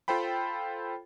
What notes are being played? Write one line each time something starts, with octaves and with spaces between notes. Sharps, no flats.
F4 A4 C5 G5 B5